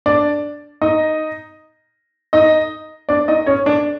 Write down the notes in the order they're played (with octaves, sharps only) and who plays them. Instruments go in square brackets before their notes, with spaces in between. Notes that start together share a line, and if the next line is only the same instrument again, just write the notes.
[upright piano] D4 D5
D#4 D#5
D#4 D#5
D4 D5
D#4 D#5
C#4 C#5
D4 D5